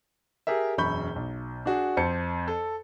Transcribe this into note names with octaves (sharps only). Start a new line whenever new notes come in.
G4 G#4 A#4 E5
E1 F#2 B5 C#6 G6 G7
B1
D4 F#4 G#4
F2 C5 A5 C#7
A4